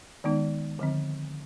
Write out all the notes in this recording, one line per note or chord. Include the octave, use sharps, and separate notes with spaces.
D#3 G#3 B3 D#4
D3 F3 C4